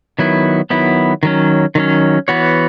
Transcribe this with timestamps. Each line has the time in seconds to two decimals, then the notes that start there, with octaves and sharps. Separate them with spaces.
0.19 D#3 F#3 B3 E4
0.70 D#3 F#3 B3 E4
1.23 D#3 F#3 C#4
1.75 D#3 F#3 C#4
2.28 E3 B3 F#4 C#5